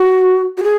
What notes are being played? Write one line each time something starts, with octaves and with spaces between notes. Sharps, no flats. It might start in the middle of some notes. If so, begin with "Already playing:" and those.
Already playing: F#4
F#4
G#4